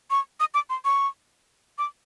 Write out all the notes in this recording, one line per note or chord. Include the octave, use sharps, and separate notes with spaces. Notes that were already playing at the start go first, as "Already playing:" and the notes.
C#6
D#6
D6
C6
C#6
D6